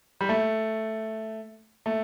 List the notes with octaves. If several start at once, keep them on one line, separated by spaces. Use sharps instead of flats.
G3
A3
A3